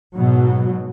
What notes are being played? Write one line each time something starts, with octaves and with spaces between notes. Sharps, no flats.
G#2 B2 F#3